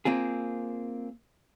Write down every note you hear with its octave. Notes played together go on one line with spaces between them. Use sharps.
A#3 C4 F4 G#4